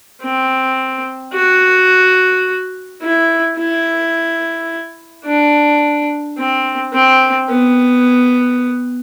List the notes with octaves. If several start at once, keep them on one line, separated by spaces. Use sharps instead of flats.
C4
F#4
E4
E4
D4
C4
C4
B3